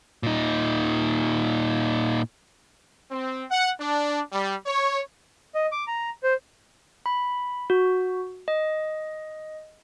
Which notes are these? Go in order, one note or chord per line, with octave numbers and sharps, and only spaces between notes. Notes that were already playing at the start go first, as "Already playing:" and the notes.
A#2 D#4
C4
F#5
D4
G3
C#5
D#5
D6
A#5
C5
B5
F#4
D#5